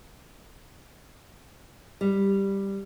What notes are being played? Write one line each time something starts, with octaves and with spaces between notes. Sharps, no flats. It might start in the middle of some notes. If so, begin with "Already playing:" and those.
G3